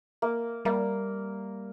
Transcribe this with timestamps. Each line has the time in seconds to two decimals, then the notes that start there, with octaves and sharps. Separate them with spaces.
0.22 A#3
0.65 G3 A#3